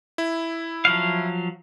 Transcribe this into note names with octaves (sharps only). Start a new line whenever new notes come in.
E4
F3 F#3 F5